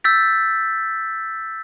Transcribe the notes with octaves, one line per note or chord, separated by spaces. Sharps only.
E6 G6 A6 B6